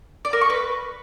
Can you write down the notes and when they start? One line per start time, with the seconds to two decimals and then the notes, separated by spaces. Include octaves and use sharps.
0.25 D5
0.33 A#4
0.41 C#6
0.50 B4